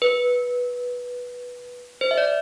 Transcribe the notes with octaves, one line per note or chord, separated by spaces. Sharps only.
B4
C5
E5
D5